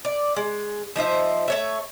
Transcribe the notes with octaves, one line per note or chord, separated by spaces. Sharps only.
D5
G#3
F3 D#4 C5 E5
A3 C#5 E5